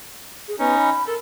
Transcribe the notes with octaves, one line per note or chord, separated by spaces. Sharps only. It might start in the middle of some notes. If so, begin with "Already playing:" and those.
G#4
B3 C#4 D#4
B5
A4 A#4